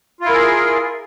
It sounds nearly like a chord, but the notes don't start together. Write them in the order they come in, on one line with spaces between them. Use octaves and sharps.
F4 E4 A#4 G#4